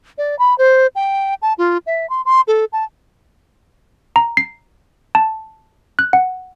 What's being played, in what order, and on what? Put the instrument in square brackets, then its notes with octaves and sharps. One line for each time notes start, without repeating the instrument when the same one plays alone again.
[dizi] D5
B5
C5
G5
A5
F4
E5
C6
C6
A4
A5
[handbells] A#5
C7
A5
F#6
F#5